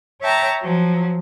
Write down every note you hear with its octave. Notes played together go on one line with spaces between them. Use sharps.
C#5 E5 G5 A5 A#5
F3 F#3